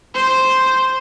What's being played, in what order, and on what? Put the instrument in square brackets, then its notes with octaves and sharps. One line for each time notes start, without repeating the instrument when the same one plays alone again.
[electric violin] C5